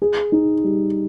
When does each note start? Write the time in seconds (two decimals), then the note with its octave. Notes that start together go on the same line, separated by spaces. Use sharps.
0.02 G#4
0.32 D#4
0.64 G3